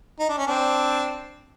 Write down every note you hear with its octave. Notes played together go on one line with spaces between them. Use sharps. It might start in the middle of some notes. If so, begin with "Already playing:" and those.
D#4
D4
C#4
C4 D4